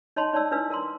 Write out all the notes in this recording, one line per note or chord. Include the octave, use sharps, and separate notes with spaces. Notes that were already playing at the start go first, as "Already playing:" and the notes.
D#4 C#5 D#5 A5 B5 C6
D#4 C#5 D5 A5 E6
D4 E4 B4 F5 E6
A#4 F5 A#5 C6